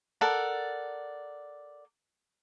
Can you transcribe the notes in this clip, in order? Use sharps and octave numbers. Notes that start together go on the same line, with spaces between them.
A4 A#4 D5 F#5